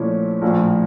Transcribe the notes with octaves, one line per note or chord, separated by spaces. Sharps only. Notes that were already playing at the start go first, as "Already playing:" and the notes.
Already playing: A#2 F3 A3 C#4 E4
A#1 A2 F3